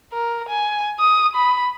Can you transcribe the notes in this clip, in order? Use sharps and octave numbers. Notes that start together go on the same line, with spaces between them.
A#4
G#5
D#6
B5